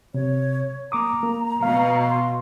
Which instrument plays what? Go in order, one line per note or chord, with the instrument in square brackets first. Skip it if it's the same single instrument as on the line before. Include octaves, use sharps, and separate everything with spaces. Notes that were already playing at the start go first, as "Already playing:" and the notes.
[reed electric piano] C3 [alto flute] C#5
[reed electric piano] A#3 D6 D#6 [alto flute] A#5
[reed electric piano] A#3
[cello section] B2 [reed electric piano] F5
[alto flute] C6